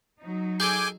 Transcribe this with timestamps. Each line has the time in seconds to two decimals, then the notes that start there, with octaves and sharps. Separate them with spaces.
0.20 F#3 D#4
0.60 G#4 A4 G#5 D6 G6